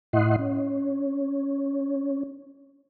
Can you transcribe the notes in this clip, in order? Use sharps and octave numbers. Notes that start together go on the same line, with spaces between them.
A2 E4 D#5 F#5 C6
C#4